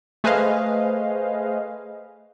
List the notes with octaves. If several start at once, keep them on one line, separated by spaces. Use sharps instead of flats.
A3 G#4 B4 C5 D#5 F5